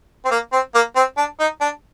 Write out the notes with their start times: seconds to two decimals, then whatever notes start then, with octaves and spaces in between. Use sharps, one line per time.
0.25 C4
0.31 A#3
0.53 C4
0.74 A#3
0.96 C4
1.17 D4
1.40 D#4
1.61 D4